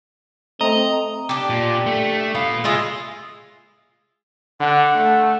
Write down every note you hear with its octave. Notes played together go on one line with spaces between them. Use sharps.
A3 C4 D#5 A#5
D4 G4
A#2
A3
A#2 B3 F5
G#3 E4 F4 G#4
D3 F#5
A3